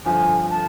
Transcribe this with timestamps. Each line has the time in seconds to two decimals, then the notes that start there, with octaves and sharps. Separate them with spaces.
0.05 G1 F2 D3 F3 G#5
0.50 A5